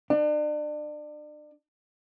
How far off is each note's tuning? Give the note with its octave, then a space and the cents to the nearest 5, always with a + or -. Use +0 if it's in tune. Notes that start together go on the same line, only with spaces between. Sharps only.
D4 +35